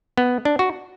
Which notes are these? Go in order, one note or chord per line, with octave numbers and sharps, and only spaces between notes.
B3
D4
F#4